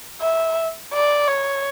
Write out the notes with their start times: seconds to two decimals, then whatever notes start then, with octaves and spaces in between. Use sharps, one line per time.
0.21 E5
0.93 D5
1.28 C#5